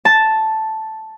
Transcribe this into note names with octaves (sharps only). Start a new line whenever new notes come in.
A5